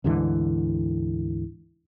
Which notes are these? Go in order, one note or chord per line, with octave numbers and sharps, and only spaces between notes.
D2 G#2 D3 E3